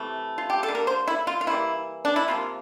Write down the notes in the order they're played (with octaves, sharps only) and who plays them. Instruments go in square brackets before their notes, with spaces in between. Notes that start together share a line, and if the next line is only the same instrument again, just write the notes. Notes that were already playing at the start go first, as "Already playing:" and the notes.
Already playing: [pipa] C3 E3 A3
F4
G4
A4
D3 G3 A#3
A#4
C5
E4
F4
F4
E3 G3 A#3 E4
D4
E4
C3 F3 A#3 F4